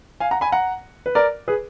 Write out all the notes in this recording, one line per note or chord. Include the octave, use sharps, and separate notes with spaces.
F5 G#5
F#5 A#5
G#5 B5
F#5 A#5
B4
A#4 D5
G#4 B4